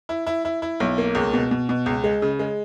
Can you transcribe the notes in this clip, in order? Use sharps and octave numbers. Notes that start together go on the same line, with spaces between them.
E4
E4
E4
E4
B1
A#3
C#2
B2
B2
B2
C#2
G#3
C#3
G#3